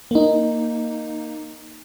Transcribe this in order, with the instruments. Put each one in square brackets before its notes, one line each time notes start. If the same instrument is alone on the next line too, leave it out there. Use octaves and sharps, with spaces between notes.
[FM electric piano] A#3 D#4